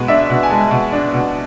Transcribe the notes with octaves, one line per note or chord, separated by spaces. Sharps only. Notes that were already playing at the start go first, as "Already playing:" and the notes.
Already playing: B2 G#3 B4
D4 E5
B2
G#5
G#3 A5
B2
D4
B2